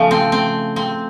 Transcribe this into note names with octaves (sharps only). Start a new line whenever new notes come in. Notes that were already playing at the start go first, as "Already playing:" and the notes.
Already playing: C#3 F3 A3
C4
C4
C4